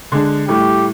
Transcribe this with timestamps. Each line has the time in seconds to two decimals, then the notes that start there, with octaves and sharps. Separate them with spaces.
0.12 D3 G#3 D4
0.49 A2 G3 A3 G4